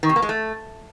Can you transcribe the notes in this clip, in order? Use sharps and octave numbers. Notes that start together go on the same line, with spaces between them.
D#3
C3
A#3
G#3
A3